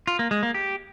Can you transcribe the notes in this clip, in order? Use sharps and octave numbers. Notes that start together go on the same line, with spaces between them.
F4
A#3
G#3
A#3
G4